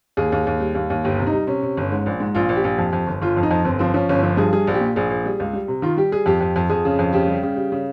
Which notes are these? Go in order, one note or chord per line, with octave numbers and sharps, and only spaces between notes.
D#2 G#4
D#2
D#2
G3
D#2
D#2
G1 G4
C3
D#4
G3
C3 C#4
C3
G1
G#2
A#1
G#2
A#1 F4
A#1
G4
A#1
F2
F2
G1
G1 F4
F2
D#4
F2
G1 C4
F3 C4
F3 C#4
G1 C#4
F3
G2 G#4
G3 G#4
A#1
G4
A#2
A#1 G#4
A#1
G3
C#2
G3
C3
D#3 F4
G3 G4
G3 G#4
F2 G4
F2
F2
F2 G#4
C#3
F2
C#3 G4
G3
C#3
G3
C#3